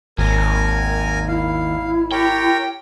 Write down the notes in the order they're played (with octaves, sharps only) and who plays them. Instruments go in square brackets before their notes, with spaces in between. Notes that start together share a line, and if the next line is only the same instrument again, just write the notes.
[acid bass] G#1 [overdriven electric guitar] D#2 [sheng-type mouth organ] A#4 G#5
[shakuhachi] E4 [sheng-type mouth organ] F5
[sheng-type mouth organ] G4 A#4 C#5 [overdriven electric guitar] G5